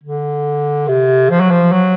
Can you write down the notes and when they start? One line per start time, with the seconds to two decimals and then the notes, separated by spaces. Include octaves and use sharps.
0.03 D3
0.88 C3
1.30 F3
1.40 F#3
1.51 F3
1.72 F#3